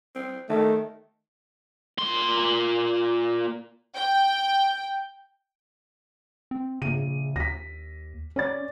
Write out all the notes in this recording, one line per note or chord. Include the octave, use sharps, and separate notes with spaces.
C4
D#3 A3
A#2 C6
G5
C4
A#1 C#3 D#7
D#2 A#6 B6
C#4 C#5 D5 A6